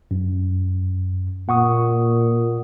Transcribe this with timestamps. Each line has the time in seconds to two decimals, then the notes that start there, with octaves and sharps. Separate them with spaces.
0.11 F#2
1.49 A#2 F#5 C#6 D#6